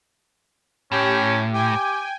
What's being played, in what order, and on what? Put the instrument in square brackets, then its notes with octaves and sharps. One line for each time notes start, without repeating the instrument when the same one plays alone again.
[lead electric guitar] A2 [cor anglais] C#4 [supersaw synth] G4 G5
[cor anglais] G4 [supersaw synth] G5 G#5